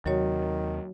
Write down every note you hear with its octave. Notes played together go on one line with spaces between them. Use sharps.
D#2 C3 D#3 F#3 F#4 C#5